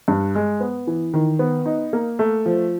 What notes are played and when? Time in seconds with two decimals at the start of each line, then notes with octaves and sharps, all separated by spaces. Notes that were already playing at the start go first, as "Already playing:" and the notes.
0.08 G2
0.35 G#3
0.60 B3
0.87 E3
1.14 D#3
1.39 B3
1.66 D#4
1.93 A#3
2.19 A3
2.46 F3